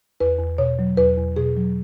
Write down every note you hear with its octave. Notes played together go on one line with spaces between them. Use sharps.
E2 B4
E2
B2 C#5
F#3
E2 B4
E2
B2 G#4
F#3